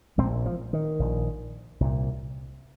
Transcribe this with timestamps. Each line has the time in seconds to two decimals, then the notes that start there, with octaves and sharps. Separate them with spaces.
0.18 A#1 G#3 C4
0.23 A#2
0.46 F3
0.73 D#3
0.99 A#1 A#2
1.80 C2 A#2